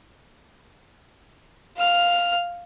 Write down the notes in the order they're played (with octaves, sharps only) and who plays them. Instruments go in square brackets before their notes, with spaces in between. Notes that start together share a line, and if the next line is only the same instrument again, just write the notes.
[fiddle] F5 F6